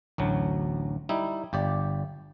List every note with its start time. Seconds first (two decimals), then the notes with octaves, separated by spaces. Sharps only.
0.18 A1 D2 F#3
1.09 G3 D#4 E4
1.53 G1 G4 D5